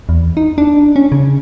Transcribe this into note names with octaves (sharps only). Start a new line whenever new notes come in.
E2
D#4
D4
C#4
C#3